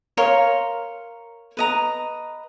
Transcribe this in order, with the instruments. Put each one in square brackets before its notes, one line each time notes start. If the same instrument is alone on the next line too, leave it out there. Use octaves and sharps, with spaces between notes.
[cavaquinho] A#4 C#5 F5 C6
B4 D#5 A#5